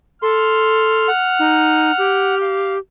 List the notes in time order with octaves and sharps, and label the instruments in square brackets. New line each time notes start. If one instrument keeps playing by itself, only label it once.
[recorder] A4 [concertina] C6 [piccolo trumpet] F6
[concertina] F#5
[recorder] D#4
G4
[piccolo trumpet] F5